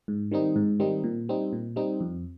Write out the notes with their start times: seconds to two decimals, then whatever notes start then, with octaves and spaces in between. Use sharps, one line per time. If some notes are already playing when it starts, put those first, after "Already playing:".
0.08 G#2
0.31 D#3 G3 C4 D#4
0.56 G#2
0.80 D#3 G3 C4 D#4
1.04 A#2
1.29 G3 C4 D#4
1.53 A#2
1.76 G3 C4 D#4
2.01 F2